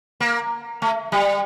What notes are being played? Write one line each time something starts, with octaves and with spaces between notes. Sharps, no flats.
A#3
A3
G3